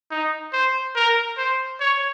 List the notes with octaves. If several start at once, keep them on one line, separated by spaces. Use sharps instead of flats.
D#4
C5
A#4
C5
C#5